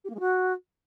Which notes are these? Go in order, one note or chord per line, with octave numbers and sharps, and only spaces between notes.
G4
A#3
G#3
F#4